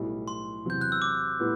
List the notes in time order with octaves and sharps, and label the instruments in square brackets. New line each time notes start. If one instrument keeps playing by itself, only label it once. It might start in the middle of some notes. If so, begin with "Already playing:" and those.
Already playing: [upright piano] B1 A2 G3
[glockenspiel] C6
[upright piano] E2 C3 F#3 [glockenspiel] G6
[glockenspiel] F#6
E6
D6
[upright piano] A2 G3 B3